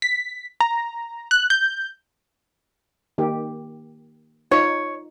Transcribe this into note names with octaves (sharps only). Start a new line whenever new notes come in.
B6
A#5
F#6
G6
D#3 A#3 G4
D#4 F4 C#5